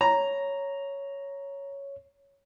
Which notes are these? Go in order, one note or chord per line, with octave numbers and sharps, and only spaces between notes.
C#5 A#5